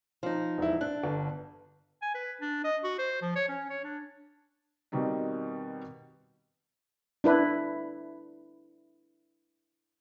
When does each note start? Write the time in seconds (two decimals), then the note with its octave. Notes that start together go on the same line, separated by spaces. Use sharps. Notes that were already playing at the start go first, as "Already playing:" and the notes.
0.23 F3 D#4
0.58 E1 E4
0.81 D4 F#6
1.04 G1
2.02 G#5
2.15 B4
2.41 D4
2.64 D#5
2.84 F#4
2.99 C5
3.22 F3
3.36 C#5
3.49 C#4
3.70 C#5
3.84 D4
4.92 B2 D#3 G3 C4 D#4
7.24 D4 E4 B4